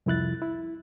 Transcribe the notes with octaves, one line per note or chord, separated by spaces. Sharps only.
C2 F2 E4 F#6 A6
E4